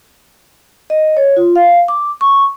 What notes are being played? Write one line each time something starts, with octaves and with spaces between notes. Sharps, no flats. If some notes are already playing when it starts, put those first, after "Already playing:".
D#5
C#5
F4
F5
D6
C#6